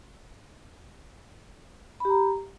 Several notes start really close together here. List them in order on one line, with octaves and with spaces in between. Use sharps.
B5 G4 A#5